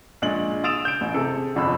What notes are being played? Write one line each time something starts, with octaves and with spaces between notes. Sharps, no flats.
A#1 G#3 F#7
D#6 E6 A6 D7 E7 F7
G6 D7
A1
C3 G#4 A4
G1 F2 D4 B5 E6